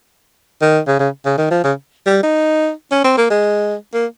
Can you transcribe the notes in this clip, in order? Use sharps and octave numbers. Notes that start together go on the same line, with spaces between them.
D#3
C#3
C#3
C#3
D#3
F3
C#3
G3
D#4
C#4
C4
A#3
G#3
A#3